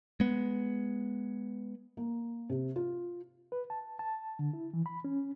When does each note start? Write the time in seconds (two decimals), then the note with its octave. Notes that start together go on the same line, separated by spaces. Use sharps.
0.20 G#3 B3
1.97 A#3
2.50 C3
2.76 F4
3.52 B4
3.70 A5
3.99 A5
4.39 D3
4.53 E4
4.74 E3
4.86 B5
5.05 C#4